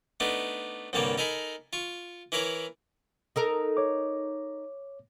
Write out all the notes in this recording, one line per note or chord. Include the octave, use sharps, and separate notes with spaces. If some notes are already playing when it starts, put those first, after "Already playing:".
A3 B3 D4 D#4
C2 G2 D3 G3 A#3 C#5
D#4 A4 A#4 G#5 B5
F4 C#6
E3 E4 A#4 C#5 D6
D#4 A4 A#4
C#5 D6